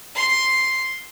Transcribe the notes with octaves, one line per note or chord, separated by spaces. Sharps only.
C6